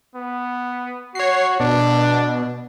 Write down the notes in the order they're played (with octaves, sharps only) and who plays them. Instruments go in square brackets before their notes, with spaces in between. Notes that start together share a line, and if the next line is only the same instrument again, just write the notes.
[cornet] B3
[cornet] F#4 [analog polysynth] C#5 C7
[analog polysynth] B2 [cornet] D4